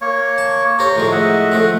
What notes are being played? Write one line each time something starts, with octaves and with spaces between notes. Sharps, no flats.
A#3 C#5 C#6
A5
G4 C5 C#5 A#5
A2 F3 G#3
D#5 E5 F#5
F3 A3 C4